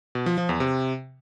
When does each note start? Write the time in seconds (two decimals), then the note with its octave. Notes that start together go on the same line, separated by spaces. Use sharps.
0.15 B2
0.26 F3
0.38 F3
0.49 E2
0.60 C3